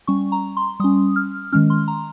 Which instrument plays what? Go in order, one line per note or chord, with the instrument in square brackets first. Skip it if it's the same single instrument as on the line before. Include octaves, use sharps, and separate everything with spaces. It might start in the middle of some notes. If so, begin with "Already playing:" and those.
[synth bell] G3 C#4 C#6
A#5
C6
G3 C#4 D#6
F6
D#3 G#3 C#4 F6
C6
A#5